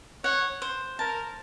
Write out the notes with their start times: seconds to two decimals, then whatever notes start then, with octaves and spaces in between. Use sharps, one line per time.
0.24 C#5 F#5
0.62 C5
0.99 A#4 A5